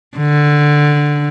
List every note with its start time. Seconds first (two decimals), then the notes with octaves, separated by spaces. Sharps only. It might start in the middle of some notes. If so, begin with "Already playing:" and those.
0.17 D3